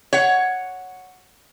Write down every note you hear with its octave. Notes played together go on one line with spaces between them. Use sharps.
C#5 F#5